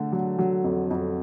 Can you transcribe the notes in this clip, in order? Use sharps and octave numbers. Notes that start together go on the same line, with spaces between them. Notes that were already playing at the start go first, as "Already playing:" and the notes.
Already playing: D3 A3
F#3
F#3
F2
F2